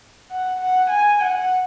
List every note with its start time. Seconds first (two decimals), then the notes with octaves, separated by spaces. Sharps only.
0.31 F#5
0.60 F#5
0.90 G#5
1.21 F#5